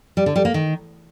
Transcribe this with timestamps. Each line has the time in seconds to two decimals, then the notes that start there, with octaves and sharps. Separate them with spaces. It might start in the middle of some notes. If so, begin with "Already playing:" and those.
0.17 G3
0.26 D3
0.36 G3
0.45 A#3
0.54 D#3